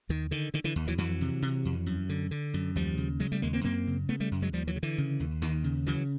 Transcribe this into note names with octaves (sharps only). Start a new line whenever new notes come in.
D#2 D#3
D3 D#3
D3 D#3
D3 E3
D#2
E3 F#3
F2 E3 F#3
C3
C3
F2
F#2
D3
D3
F#2
D#2 F3 G3
C#3
C#3 F#3 G#3
G3 A3
D#2 G#3 A#3
A#3 C4
F#2 A#3 C4
C#3
C#3 A3 B3
G3 A3
F#2
F#3 G#3
D#2 F3 G3
E3 F#3
C#3
D3 E3
C#3
D#2
D#2 D#3
C#3
C#3 E3 F#3